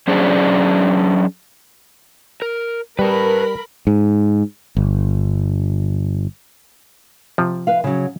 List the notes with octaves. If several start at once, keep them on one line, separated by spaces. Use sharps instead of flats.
F#3 C#4 D4 G#4 C5 D5
A#4
G3 A#4 B4 A5 B5
G#2
G1
C3 F3
B4 F5
C#3 F#3